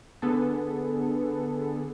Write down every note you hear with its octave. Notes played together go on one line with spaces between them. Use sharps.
D3 B3 G#4 A4